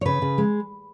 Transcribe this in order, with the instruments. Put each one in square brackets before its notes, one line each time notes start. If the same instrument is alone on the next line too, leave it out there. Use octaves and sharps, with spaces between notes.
[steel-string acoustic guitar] C#5
C#3 B4
C#3
G#3